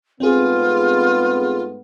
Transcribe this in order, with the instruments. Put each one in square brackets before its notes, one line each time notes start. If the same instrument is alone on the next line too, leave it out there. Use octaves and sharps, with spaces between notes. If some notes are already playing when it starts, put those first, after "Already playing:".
[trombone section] G#2 A3 B3 [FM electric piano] C4 G#4 [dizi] F4